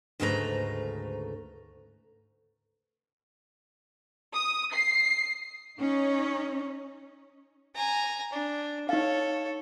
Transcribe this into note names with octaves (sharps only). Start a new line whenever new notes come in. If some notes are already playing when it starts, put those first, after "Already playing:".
D2 G#2 C#3 A3 B4 A#5
D#6
C7
C#4 D#4
G#5 A#5
D4
D#4 A4 C#5 F5